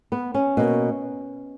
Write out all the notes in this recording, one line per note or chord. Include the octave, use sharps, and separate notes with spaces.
B3
C#4
B2 A#3